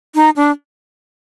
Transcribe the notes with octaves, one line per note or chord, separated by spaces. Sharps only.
D#4
D4